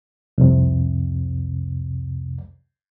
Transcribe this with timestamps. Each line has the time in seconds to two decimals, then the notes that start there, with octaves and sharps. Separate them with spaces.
0.38 C2 F2 C3